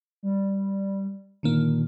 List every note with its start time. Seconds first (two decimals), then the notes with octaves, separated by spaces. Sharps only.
0.23 G3
1.43 A#2 D3 D#3 A#3